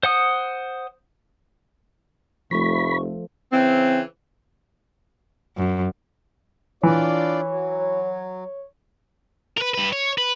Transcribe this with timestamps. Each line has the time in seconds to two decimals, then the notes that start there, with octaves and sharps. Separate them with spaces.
0.03 C5 F#5 D#6
2.51 F1 F3 A3 B5 C#6
3.53 C#3 E3 C4
5.57 F#2
6.83 E3 D4 F4 C#5 D5
7.47 F#3
9.57 A#4 B4
9.74 G2 B4
9.92 C#5
10.18 B4